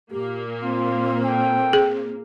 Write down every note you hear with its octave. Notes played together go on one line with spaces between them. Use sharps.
A#2 A#3 G4
C4 F4
A4 G5
G#4